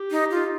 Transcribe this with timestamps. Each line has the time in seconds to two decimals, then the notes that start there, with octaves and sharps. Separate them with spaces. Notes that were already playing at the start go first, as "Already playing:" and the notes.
Already playing: G4
0.11 D#4
0.31 F4